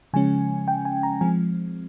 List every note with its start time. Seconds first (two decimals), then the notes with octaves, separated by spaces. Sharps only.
0.14 C#3 F3 G#3 C#4 G#5
0.68 G5
0.85 G#5
1.03 A#5
1.21 F3 G#3 C4 G#5